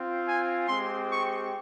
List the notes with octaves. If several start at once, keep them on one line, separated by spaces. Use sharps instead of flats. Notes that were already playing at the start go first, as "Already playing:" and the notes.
Already playing: C4 F4
G#5
G#3 C4 G4 C6
C#6